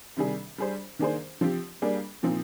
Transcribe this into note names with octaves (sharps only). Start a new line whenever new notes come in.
C3 D#3 G3 D4 G#4
G3 D4 G#4 C5
D#3 A#3 D4 G#4 C5
F3 C4 G4
G3 A#3 D4 G#4
A#2 F3 C4 D#4